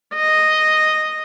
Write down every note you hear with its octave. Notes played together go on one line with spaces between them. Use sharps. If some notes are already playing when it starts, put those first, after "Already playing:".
D#5